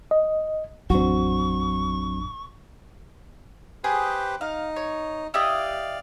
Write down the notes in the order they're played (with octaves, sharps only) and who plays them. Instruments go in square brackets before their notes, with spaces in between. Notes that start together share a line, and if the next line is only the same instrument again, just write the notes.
[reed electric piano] D#5
[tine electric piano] A1 F2 D4 [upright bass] F#3 [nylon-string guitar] C4 F#4 [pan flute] C#6
[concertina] G4 B4 C5 [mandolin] G#4
[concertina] D#4 [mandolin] F5
[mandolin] C#5
[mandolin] E4 G4 D#5 [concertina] D5 F5